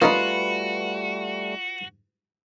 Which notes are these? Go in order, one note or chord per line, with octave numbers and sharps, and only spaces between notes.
G3 A3 A#3 C#4 D#4 F4 F#4 B4